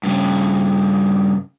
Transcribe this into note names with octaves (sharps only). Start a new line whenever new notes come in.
G2 C#3